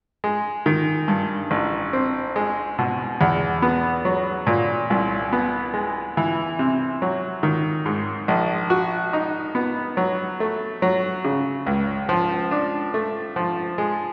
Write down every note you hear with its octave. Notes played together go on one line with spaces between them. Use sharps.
G#3
D#3
G2
A1
C4
G#3
B2
E2
B3
F#3
A#2
C2
B3
G#3
E3
C3
F#3
D#3
G#2
A#1
F#4
D#4
B3
F#3
A3
F#3
C#3
C#2
F3
D4
A3
F3
G#3